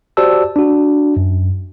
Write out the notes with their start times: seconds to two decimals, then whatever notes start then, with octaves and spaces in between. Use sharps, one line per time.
0.17 F#4 G4 C5 D5 A5 E6
0.56 D4 F#4
1.17 F#2